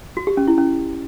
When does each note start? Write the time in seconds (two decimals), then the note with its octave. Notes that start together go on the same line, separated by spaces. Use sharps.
0.17 F#4
0.27 G4
0.37 C#4
0.48 E4
0.58 C#4